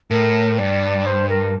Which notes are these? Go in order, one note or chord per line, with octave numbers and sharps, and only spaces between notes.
A2 A#4
G2 D5
C5
A#4